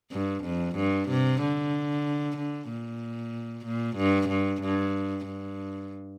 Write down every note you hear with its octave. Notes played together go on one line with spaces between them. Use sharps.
G2
F2
G2
C3
D3
D3
A#2
A#2
G2
G2
G2
G2